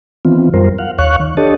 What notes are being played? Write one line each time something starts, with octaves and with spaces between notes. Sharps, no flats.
D#3 E3 B3 C4 F4
F#2 G3 F4 A#4 C5
F5 F#5
D#2 C#5 F5 C#6 F#6
D#3
D4 G4 A4 C#5 D#5 A5